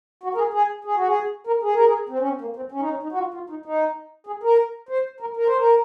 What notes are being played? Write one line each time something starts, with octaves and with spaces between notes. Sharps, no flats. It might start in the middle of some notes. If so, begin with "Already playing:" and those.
F#4
A#4
G#4
G#4
G#4
F#4
G#4
A#4
G#4
A#4
G#4
C4
C#4
C4
A#3
C4
C#4
D#4
C#4
D#4
F#4
F4
F4
D#4
D#4
G#4
A#4
C5
A#4
A#4
C5
A#4